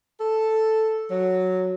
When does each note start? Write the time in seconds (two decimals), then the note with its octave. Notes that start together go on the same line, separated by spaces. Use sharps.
0.20 A4
1.11 F#3